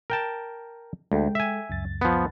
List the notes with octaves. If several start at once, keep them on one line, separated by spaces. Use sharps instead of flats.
A#4 G5 A5
D2 G#3 A4 G5
E5 G#5
C#2 F#2 A6
F3 B3